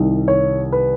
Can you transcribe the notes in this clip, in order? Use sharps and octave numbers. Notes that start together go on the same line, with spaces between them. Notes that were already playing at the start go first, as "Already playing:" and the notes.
Already playing: C2 C3 D#3
C#5
B4